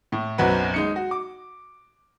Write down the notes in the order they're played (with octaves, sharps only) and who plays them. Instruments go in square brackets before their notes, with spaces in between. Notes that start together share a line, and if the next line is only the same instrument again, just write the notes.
[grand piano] A2
B1 F#2 F#3 C4 B4 F#5
G#3 D#4 C#7
F#4
D6